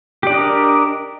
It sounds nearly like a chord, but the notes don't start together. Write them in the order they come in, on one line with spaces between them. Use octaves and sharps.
G4 D5 D4 D#5 A#4